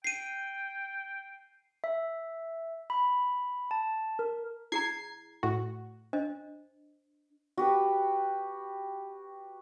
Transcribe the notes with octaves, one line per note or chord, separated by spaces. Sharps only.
G5 C7 D#7
E5
B5
A5
A#4
E4 G#4 A#5 G#6 C7
A2 F#4
D4 C5 D#5
F#4 G4 B4